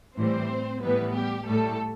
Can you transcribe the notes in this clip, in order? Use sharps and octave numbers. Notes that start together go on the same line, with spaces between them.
A2 E3 G3 C4 C5
A2 E3 G3 B3 B4
G3 G4
A2 G3 A3 A4